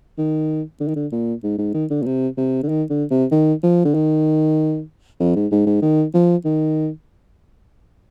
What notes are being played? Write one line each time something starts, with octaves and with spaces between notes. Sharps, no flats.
D#3
D3
D#3
D3
A#2
G#2
G#2
D#3
D3
A#2
C3
C3
D3
D#3
D3
C3
D#3
F3
D3
D#3
F2
G#2
G#2
G#2
D#3
F3
D#3